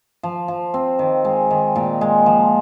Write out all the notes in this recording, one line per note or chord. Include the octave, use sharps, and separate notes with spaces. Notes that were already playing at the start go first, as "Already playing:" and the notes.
F3
F3
C4
D#3
G#3
D#3
A#2
G#3
F3